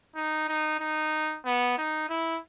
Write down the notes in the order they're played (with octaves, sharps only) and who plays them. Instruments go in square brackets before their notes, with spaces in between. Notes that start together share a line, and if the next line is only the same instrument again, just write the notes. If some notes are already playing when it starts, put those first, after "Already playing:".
[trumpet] D#4
D#4
D#4
B3
D#4
E4